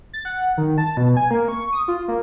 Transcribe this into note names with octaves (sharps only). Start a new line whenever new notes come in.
A6
F#5
D#3
A5
B2
G#5
A#3
C#6
D#6
F4
A#3